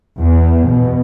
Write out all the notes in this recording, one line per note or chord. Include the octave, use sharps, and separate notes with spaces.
E2
B2